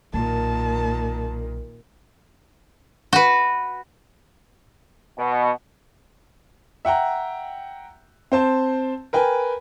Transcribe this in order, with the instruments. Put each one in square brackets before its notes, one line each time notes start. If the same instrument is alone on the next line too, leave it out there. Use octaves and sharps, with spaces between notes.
[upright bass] B1 [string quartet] A#2 D#3 [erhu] A5
[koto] F#4 B4
[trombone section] B2
[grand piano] E5 F#5 G5 A#5
C4 C5 A5
A#4 B4 G5 G#5